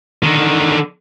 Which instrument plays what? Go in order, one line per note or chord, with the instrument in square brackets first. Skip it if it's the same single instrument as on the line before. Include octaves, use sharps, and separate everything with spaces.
[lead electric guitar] D3 D#3